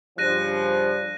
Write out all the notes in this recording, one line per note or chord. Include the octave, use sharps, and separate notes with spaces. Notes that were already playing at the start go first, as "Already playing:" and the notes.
G2 C#3 F3 G4 D5 F#6 A#6 D#7